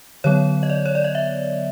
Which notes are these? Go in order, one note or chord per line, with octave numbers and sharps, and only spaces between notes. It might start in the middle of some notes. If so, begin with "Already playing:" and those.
D3 F#3 B3 C#5
D#5
D5
C#5
D5
D#5
E5